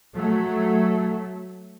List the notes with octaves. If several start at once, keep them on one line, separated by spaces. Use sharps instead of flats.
F#3 A3